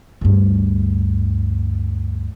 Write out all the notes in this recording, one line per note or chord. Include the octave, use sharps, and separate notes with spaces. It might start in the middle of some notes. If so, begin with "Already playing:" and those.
D2 G2